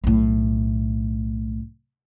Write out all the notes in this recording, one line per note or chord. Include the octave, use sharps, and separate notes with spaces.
B1 A2